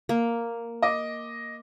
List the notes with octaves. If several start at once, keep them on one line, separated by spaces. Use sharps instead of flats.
A#3
D#5 D6